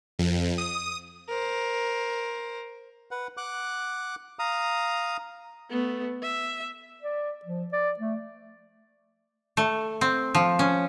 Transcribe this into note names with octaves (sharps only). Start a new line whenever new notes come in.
F2
D#6
A#4 C5
B4 F#5
F#5 D6 F#6
F5 A#5 D#6
A3 B3
E5
D5
F3
D5
A3
A3
C4
F3
C#4